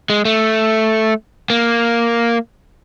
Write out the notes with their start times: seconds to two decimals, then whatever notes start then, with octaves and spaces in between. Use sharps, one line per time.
0.10 G#3
0.25 A3
1.50 A#3